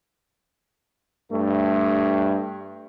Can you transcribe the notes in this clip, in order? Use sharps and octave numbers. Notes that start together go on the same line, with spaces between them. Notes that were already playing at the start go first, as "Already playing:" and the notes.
G2 A3